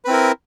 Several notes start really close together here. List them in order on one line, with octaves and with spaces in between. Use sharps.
B4 C4 E4 A#4